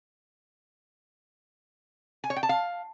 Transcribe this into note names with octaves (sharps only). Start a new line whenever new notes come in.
G#5
C#5
G5
A5
F5